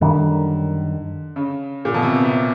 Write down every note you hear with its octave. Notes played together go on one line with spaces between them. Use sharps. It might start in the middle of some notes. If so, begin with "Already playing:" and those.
F#2 D3 D#3 G3
C#3
A#2
B2
C3
C3